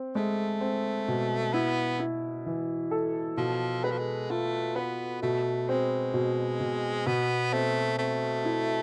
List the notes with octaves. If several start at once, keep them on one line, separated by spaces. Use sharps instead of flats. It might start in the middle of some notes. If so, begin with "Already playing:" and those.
Already playing: C4
G#3 A3
C4
B2
B3 E4
E4
E3
A4
B2 F3
G#3 B4
F3
G#3
A3 F4
B3 B4
B2 A3
G#3 C4
B2
B2
B2 B3
A3 C4
A3 C4
E4